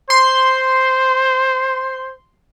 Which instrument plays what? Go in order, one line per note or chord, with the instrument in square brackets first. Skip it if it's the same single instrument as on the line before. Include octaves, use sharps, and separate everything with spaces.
[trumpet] C5 [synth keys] C6